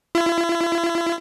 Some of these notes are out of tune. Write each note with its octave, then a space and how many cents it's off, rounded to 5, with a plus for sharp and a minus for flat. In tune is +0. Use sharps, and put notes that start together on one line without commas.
E4 +40